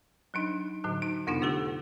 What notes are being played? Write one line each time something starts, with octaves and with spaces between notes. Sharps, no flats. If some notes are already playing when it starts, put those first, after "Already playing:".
F#3 D4 D#4
A2 D3 F#3
D#4
F2 C3 B3 D4 D#4 F4
D3 A3 G4 A4